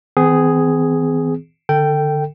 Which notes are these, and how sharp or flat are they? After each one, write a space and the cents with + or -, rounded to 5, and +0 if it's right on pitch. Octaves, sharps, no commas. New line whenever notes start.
E3 -45 C4 -45 G#4 +0
D3 +5 A4 +25 G5 -10